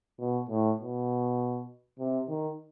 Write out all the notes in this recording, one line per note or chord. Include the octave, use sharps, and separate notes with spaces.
B2
A2
B2
C3
D#3